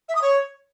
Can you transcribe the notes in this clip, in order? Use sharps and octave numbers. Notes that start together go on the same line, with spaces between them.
E5
D#6
C#5